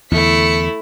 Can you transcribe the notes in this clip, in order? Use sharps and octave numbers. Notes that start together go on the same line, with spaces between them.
E2 D3 A3 E4 B6 C#7